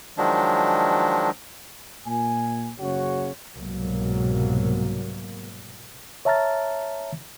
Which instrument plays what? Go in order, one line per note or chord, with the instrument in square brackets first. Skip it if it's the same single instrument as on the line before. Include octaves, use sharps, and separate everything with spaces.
[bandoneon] D#3 F3 F#3 G#3 D4
[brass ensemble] A#2 G#5
F#1 C#3 F#4 C#5
[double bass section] C2 G#2 B2 F#3 A#3
[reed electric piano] C#5 E5 A5 A#5 F6 A6